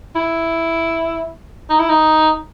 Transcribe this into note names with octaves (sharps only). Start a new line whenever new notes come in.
E4
D#4
E4
D#4